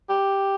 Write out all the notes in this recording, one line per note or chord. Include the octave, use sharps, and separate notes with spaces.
G4